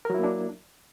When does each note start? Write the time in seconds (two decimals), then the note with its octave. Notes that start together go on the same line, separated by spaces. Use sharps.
0.05 A#4
0.10 F#3
0.14 E4
0.19 A#3
0.24 D4